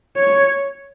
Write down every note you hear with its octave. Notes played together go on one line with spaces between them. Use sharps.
C#5